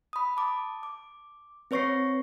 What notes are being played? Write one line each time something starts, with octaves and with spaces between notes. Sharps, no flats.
B5 D#6
A5 D6
D6
C4 B4 C#5 C#6 A#6 C7